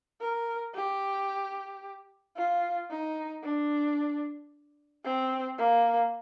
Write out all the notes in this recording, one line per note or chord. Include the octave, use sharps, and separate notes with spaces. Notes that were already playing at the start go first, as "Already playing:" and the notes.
A#4
G4
F4
D#4
D4
C4
A#3